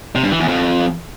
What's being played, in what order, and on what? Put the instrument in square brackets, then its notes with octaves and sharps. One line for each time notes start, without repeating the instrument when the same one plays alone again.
[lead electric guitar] C3
G2
E3
E2
F2